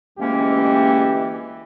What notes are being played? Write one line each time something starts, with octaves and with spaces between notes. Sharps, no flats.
D2 E3 G#3 A#3 C#4 G4